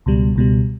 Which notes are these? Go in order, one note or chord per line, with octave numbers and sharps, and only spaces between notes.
C#2 B2 G3
C#2 B2 G3